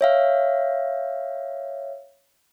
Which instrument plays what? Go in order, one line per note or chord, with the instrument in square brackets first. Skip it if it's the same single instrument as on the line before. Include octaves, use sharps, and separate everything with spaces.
[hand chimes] C#5 E5 F5